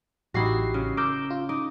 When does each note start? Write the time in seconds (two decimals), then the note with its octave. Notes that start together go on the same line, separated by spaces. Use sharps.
0.34 A1 D#4 E4 F#4 G4 C7
0.74 C#3
0.97 A#4 D6 E6 G6
1.30 F4
1.49 D#4 D6